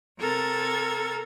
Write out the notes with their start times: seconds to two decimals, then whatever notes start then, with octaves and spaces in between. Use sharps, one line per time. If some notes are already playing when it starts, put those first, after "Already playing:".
0.19 C3 A4 A#4 G#6 A6